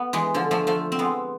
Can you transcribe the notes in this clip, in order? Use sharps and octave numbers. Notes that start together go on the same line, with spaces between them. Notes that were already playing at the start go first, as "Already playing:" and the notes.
Already playing: B3
E3 G#3
D3 F3
F3 A3
F3 A3
C4
G#3 B3